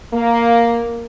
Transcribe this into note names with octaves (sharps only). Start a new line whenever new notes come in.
A#3